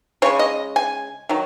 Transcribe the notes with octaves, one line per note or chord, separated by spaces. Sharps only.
C#3 G#3 C#5
D#5
G#5
D#3 F#3